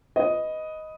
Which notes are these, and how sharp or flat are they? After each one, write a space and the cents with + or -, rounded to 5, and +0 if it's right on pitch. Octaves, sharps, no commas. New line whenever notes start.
B4 +0 D#5 +5